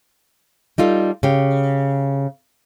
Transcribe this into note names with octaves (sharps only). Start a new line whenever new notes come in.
G3 D#4 F4 A4
C#3 G4